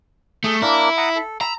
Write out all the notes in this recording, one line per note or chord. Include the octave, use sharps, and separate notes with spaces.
A3 G#4
A#3 D4 E4 A#4
F#5 A#5 D#6
A4
A#5 B5 E6